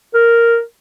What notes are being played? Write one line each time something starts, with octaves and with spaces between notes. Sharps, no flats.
A#4